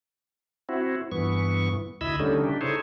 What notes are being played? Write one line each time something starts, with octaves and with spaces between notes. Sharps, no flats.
C4 E4 F#4
G2 E3 B3 C#6
D2 E4 D#5 B5 E6
D3 G3 A3 C#4 D#4
C#3 D4 G4
D#4 E4 G#4 A4 C5 C#5